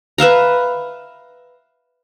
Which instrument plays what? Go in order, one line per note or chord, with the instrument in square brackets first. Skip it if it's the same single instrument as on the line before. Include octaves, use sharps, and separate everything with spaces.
[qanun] B4 E5 F5 A#5